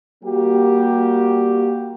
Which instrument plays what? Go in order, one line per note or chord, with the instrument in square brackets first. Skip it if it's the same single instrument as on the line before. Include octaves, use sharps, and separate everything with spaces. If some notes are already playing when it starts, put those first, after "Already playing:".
[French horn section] G3 A#3 F#4 G4